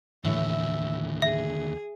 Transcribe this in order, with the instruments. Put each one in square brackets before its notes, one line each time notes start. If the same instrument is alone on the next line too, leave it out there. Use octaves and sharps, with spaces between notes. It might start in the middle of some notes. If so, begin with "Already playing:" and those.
[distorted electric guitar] D#2 D3 [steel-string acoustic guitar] A2 E3 C#5 [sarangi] E5
[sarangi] G#4 [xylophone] E5